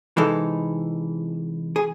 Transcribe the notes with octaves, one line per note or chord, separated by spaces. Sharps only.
C3 E3 G#3 D#4 A4
G#4